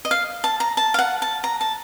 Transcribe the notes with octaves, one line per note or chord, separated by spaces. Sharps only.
D#5
F5
A5
A#5
A5
F5
F#5
A5
A#5
A5